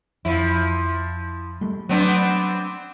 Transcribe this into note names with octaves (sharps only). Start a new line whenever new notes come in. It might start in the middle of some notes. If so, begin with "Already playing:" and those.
F2 F3 E4
G3 A3
F#3 B3 C4 D4